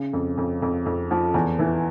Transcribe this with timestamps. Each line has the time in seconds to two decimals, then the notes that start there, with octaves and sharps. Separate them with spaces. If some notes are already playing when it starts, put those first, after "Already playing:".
Already playing: C#3
0.13 F2
0.38 F2
0.62 F2
0.86 F2
1.11 F3
1.34 E2
1.59 E3